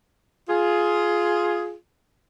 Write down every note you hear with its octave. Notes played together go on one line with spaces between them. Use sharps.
F4 G#4